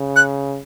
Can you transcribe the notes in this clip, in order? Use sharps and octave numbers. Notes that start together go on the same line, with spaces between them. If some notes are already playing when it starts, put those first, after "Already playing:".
Already playing: C#3
F#6